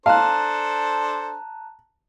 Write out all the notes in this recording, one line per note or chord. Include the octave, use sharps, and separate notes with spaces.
D4 A4 C5 F5 A5 A#5 F#6